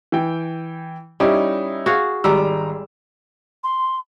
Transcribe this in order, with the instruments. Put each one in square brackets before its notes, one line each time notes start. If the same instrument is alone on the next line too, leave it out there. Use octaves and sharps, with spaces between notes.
[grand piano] E3 G5
[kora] G3 [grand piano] C#4 D#4 E4
[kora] F#4 G#4 F5
[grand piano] G#1 A#5 E6 [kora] G3 G#3
[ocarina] C6